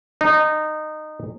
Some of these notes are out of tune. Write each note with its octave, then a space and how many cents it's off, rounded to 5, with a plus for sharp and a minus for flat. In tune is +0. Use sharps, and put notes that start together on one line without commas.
D#4 -20